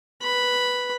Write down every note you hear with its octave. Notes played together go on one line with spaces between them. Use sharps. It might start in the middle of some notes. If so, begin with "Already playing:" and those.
B4 B5